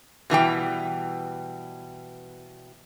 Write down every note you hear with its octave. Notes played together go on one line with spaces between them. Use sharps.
B2 E3 G3 G5